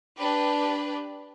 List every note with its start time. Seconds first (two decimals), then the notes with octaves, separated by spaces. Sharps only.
0.18 D4 G4 B4